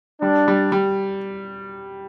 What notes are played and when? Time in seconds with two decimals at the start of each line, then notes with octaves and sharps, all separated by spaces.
0.22 G3 D4
0.48 G3
0.72 G3